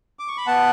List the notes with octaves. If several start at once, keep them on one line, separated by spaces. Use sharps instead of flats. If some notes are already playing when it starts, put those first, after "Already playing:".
D6
C#6
B5
B3 F#5 A5